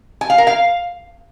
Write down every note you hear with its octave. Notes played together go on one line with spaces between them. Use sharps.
G#5
F5
A#4
F5